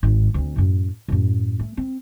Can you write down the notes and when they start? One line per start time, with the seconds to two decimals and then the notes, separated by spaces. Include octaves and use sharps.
0.03 G#1 G#2
0.34 D2 C4
0.56 F#2 A2
1.08 F#2 A2
1.59 A3
1.77 C4